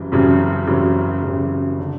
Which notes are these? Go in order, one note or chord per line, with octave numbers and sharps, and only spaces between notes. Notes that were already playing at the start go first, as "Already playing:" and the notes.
Already playing: F#1 F#2 C#3 E3 G3
F#1 F#2 C#3 E3 G3
F#1 F#2 C#3 E3 G3
F#1 F#2 C#3 E3 G3
D3